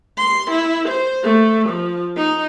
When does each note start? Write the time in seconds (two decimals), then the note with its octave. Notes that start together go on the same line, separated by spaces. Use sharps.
0.18 C6
0.51 E4
0.89 C5
1.23 A3
1.69 F3
2.17 D#4